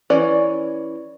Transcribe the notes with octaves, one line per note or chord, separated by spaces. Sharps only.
E3 C#4 D5